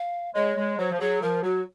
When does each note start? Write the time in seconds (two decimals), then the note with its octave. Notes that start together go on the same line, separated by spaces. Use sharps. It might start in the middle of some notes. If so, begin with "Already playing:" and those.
Already playing: F5
0.35 G#3 C#5
0.57 G#3
0.78 F#3 C5
0.92 F3
1.00 F#3 G#4
1.22 F3 A#4
1.43 F#3 F#4